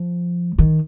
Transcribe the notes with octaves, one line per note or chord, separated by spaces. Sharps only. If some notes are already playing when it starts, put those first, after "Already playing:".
Already playing: F3
D#3